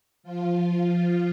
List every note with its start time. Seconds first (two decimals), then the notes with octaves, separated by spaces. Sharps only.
0.23 F3 F4